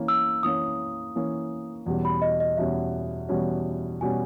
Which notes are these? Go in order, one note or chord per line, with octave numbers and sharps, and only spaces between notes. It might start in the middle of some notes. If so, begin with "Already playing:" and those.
Already playing: E3 A#3 C#4
E6
E3 A#3 C#4 D#6
E3 A#3 C#4
E2 B2 G3 C#4
B5
D#5
D#5
E2 B2 G3 C#4 E5
E2 B2 G3 C#4
B2 G3 C#4 G#5